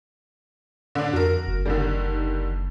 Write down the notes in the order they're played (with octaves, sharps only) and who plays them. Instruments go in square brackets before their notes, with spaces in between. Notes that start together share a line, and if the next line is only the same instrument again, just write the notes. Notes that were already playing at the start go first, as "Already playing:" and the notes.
[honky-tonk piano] D3 D4
[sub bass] F2 [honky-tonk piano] F#4 A#4
[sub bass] F#1
[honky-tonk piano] D3 D#3 G3